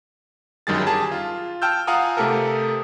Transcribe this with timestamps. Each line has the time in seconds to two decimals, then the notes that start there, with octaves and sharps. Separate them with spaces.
0.67 G1 F#2 D#3 G3 G#4 A6
0.87 G4 G#4 A5
1.12 F4
1.62 G5 A5 E6 F6 G6
1.87 F4 F5 F#5 G#5 A#5 D#6
2.17 C3 A3 C4 G4 A4 A#4